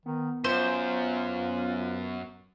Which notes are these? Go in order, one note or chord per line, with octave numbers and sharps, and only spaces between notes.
D#3 B3
F#2 F4 C5